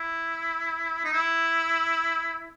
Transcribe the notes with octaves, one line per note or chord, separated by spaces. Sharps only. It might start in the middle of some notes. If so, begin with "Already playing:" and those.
Already playing: E4
D#4
E4